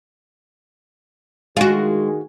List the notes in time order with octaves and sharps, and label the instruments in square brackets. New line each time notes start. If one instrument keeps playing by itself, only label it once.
[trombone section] D#3 G#4 [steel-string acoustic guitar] G#3 [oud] F4 F#4